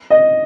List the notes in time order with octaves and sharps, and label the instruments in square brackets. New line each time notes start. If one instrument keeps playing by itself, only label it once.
[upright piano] D#5